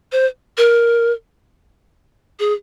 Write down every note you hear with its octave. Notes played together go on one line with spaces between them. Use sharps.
C5
A#4
G#4